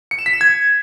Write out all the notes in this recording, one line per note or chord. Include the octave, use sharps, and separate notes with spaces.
C#7
E7
B6
E7
G#6